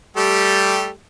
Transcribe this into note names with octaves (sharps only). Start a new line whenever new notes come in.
G3 A3 G4